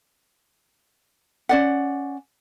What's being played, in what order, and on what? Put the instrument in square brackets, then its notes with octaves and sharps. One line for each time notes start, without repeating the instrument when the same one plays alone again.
[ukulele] C#4 D5 F#5